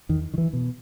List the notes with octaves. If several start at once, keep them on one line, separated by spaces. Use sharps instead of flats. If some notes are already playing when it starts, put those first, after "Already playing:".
E2 D#3
D#3
E3
B2